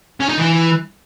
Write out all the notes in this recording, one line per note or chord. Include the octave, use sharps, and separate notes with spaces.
C#4
D#4
E3